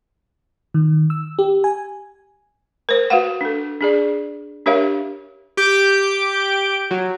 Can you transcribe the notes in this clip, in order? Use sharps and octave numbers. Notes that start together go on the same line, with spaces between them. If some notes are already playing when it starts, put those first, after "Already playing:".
D#3
E6
G4
G#5
A#4 C5
F#4 B4 F5 F#5
D4 A4
D4 G#4 D5
D4 G4 A#4 C#5 E5 F5
G4 D6 G6 D7
F#3